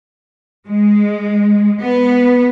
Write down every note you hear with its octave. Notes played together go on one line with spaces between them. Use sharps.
G#3
B3